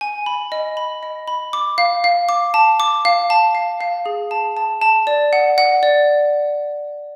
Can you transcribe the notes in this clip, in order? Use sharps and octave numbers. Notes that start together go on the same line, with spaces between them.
G#5
B5
D#5
B5
D#5
B5
D6
F5
F5
D6
A5
D6
F5
A5
F5
F5
G#4
A5
A5
A5
D5
F#5
F#5
D5